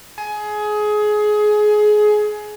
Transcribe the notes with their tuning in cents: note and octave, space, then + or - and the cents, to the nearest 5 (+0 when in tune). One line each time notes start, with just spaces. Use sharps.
G#4 +20